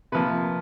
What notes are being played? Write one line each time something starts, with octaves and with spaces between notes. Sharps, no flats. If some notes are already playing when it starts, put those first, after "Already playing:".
C3 F3 A#3 B4